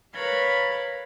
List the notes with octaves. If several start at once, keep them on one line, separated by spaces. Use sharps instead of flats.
A#4 B4 C#5 F5 B5 A6